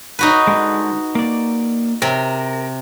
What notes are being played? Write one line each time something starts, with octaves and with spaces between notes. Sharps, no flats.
D#4 F#4 B4
D3 G#3
A#3 D5
C3 A#4